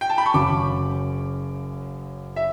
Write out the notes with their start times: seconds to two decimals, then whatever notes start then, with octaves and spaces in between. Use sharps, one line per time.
0.01 G5
0.10 A5
0.18 B5
0.26 C#6
0.34 F#1 F#2 C#3 D6
2.36 E5